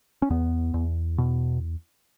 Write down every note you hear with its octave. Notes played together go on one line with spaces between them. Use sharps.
C#4
E2 B3
E2
B2